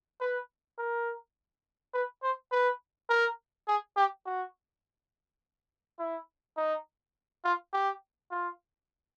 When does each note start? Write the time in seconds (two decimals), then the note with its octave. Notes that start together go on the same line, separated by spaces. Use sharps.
0.20 B4
0.78 A#4
1.94 B4
2.23 C5
2.52 B4
3.09 A#4
3.68 G#4
3.96 G4
4.26 F#4
5.99 E4
6.57 D#4
7.44 F4
7.73 G4
8.31 F4